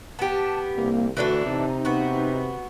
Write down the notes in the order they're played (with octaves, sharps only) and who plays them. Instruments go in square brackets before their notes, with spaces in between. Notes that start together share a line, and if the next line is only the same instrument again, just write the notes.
[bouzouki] B3 G4 [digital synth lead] A5
[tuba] C2 [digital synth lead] A#3
[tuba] D2 [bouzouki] E3 D4 A4 [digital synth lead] F#4
[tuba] C3 [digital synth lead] D#4
[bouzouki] B3 F#4